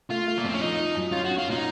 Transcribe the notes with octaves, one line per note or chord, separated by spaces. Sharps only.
A3 F4
A3
A#3
F2 C4
C#4
F3 D#4
F3
F#2
C#4 F4
F#4
C#4
F4
A#2 D#4